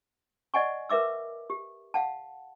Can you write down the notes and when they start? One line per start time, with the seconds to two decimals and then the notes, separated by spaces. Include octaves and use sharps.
0.54 D5 D#5 F#5 G#5 C#6
0.89 A#4 B4 E5 D6 E6
1.50 G4
1.94 F5 F#5 A5